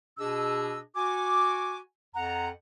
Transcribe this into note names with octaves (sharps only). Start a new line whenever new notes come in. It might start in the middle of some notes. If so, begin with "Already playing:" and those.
B2 D4 G#4 D#5 E6
F#4 G#5 D6
F2 F#5 A#5